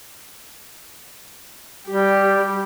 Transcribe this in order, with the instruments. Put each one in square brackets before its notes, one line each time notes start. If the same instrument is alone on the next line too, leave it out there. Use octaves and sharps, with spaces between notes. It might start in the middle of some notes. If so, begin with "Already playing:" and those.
[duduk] G3 [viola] G4